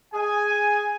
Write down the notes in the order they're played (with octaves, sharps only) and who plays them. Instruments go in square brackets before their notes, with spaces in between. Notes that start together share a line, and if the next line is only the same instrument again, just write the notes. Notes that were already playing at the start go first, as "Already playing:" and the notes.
[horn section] G#4 G#5